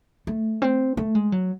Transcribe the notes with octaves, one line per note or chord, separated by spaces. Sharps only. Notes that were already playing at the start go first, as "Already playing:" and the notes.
A3
C4
A3
G#3
F#3